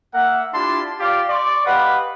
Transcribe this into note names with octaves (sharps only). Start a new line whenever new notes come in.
A#3 A#4 E5 F#5
D4 E4 F4 G4 A5 C6
F4 G4 D5 F5
D5 C6 C#6
G4 B4 D#5 F5 F#5